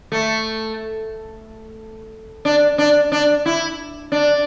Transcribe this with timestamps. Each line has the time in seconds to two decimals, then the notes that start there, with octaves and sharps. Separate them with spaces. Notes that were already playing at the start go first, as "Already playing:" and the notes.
0.12 A3
2.45 D4
2.78 D4
3.12 D4
3.46 E4
4.12 D4